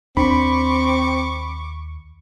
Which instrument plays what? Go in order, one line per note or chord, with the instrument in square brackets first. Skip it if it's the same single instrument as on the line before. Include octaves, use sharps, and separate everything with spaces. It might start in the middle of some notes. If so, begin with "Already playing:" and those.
[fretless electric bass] D#2 D4 [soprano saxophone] C4 [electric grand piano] B5 [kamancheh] C#6 D6